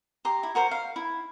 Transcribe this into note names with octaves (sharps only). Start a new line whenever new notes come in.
G4 A#5 C6
E4
F#4 A#4 C5
F5
E4